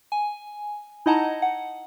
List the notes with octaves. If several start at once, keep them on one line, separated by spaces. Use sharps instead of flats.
G#5
D#4 E4 D#5 F#5 A5 A#5
F#5